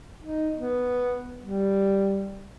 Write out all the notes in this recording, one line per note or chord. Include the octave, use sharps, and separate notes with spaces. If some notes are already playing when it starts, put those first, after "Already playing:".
D#4
B3
G3